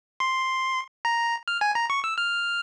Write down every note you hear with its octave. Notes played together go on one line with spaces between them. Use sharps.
C6
A#5
F6
G#5
A#5
C#6
E6
F6